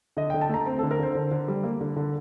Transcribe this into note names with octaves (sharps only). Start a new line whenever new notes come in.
D3 D#5
D3 G5
A5
A3 A#5
C4
D3 A4
A#4
D3 C5
D3
D3
G3
A#3
D3
D3